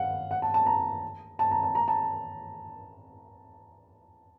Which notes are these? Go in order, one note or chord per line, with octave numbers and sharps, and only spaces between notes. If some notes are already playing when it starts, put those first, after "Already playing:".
Already playing: F5 F#5
F#5
A5
A5
A#5
A5
A#5
A5
A#5
A5